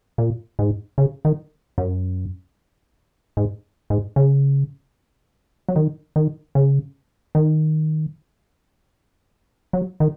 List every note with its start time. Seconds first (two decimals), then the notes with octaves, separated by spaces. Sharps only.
0.18 A#2
0.59 G#2
0.98 C#3
1.25 D#3
1.78 F#2
3.37 G#2
3.90 G#2
4.16 C#3
5.69 F#3
5.76 D#3
6.16 D#3
6.55 C#3
7.35 D#3
9.73 F#3
10.00 D#3